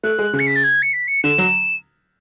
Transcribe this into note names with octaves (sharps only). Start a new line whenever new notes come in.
A3 F#6
G#3
C#3
C#7
B6
A6
G#6
C#7
B6
C#7
D3 E7
F#3